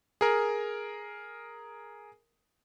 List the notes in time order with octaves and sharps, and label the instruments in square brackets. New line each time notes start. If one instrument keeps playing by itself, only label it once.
[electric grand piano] G#4 A#4